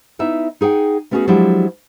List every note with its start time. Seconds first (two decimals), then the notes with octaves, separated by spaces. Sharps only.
0.19 B3 D#4 E4 E5
0.61 D#4 G#4 F#5 G5
1.11 A3 B3 C#4 F4 F#4 G#4
1.27 F3 F#3 G#3 D4 E4 G4